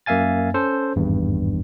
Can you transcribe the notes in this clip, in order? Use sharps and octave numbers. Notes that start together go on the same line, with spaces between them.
F#2 A#3 E5 F5 G#5 A6
C#4 A4 C5
G#1 E2 G2